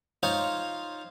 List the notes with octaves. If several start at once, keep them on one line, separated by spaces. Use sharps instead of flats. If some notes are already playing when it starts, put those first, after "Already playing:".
D#4 F4 C5 C#5 F5